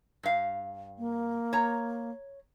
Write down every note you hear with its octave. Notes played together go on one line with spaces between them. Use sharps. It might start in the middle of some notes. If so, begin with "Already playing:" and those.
G2 F5
A#3
C#5 A#5